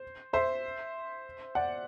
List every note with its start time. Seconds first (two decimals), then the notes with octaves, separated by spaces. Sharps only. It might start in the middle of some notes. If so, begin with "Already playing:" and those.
Already playing: C5
0.33 C5 E5
1.55 D5 F#5